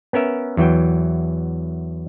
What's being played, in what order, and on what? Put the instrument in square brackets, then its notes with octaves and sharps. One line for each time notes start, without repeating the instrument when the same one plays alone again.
[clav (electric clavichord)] B3 C#4 A#4 E5
E2 E3 F#3 G5